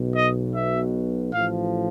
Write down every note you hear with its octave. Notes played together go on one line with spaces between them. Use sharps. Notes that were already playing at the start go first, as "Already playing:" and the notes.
Already playing: B1 B2
D#5
E5
A1 A2 F3 F5